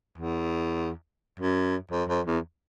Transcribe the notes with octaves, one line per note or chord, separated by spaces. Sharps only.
E2
F#2
F2
F2
E2